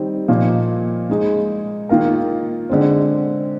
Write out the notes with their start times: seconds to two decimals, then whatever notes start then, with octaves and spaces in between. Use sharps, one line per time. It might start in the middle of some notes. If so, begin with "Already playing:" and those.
Already playing: D#3 G3 C4 D#4
0.28 A#2 F3 A#3 D#4
1.10 G#3 D#4 G#4
1.89 D#3 A#3 F4 A#4
2.70 D3 G#3 C4